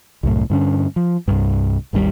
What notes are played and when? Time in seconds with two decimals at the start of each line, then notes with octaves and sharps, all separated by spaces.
0.23 C2 F#2 A2
0.50 G2 D3 C#4
0.96 F3
1.28 C2 G2
1.93 G#1 D#2 C#3 G3